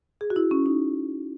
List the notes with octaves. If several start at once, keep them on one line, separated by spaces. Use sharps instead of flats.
G#4
F#4
E4
C#4
D#4